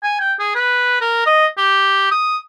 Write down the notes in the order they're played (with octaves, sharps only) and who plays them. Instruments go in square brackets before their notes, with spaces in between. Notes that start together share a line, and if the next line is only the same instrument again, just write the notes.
[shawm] G#5
G5
G#4
B4
A#4
D#5
G4
D#6